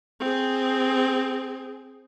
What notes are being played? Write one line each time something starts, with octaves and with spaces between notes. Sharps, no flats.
C4 G#4